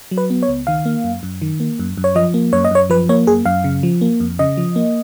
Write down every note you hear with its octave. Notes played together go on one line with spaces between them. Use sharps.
F#3
B4
B3
C#5
C#2
D#3 F5
A#3
F#2
F#2
D#3
A#3
F#2
F#2
C#5
F3 D#5
A#3
F#2 C#5
D#5
F#2 C#5
F3 B4
A#3 C#5
F#2 G#4
F#2 F5
C#3
F3
A#3
F2
C#3 D#5
F3
A#3